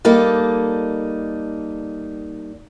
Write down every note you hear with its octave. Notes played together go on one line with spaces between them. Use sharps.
G3 A#3 D#4 A4